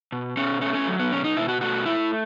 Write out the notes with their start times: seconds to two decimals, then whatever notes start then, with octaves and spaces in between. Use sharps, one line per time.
0.12 B2
0.37 B2 C#4
0.61 A3 C#4
0.75 C#4
0.87 F#3
1.00 B3
1.11 B2 C#4
1.24 D#4
1.37 B2 E4
1.48 F#4
1.61 A3 F#4
1.86 A3 E4